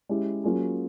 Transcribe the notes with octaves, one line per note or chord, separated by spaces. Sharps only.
G#3 C#4 E4 G4
F#3 A#3 C#4 F4 G#4